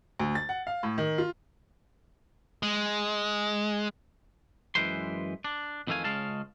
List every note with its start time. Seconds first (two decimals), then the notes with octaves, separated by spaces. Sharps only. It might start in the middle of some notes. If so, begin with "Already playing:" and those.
0.20 D2
0.35 A6
0.49 F#5
0.67 F5
0.83 A2
0.98 D#3
1.18 F4
2.63 G#3
4.75 F#2 E3 G#3 B4 C5 C6
5.45 D4
5.87 F2 D#3 E3 A3 F5 G#5
6.04 C#2 G#3 C#4 F5 A5